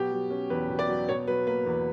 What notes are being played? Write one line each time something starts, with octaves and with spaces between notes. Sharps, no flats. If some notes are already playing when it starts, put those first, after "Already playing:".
Already playing: B2 F#3 G4
F#3
C#4
E2 B4
B2
D5
F#3
B2 C#5
F#3 B4
A#3 B4
E2